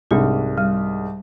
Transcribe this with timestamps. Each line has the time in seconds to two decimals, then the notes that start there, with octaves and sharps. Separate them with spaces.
0.11 C2 G#2 D4 A4
0.58 G3